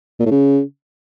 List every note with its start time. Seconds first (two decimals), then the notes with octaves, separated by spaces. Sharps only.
0.20 A#2
0.26 A2
0.31 C#3